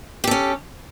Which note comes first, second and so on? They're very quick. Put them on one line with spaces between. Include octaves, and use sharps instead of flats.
G4 A4 C#4